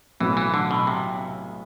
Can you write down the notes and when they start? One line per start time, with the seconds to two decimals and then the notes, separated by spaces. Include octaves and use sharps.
0.20 B1 A2 E3 F#3 B3 F#4
0.37 E3
0.54 D3
0.71 B2
0.87 C3